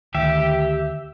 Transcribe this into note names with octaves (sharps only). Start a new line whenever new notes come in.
D2 D#3 G4 E5